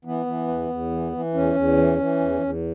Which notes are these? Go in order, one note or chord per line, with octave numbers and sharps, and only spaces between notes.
E3 B3
E3
E2
E2
E3
E3
E2 C#4
E2
E3
E3
E2
E2